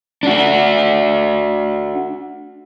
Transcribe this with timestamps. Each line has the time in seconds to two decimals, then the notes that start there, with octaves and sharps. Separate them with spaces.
0.23 D4 F#4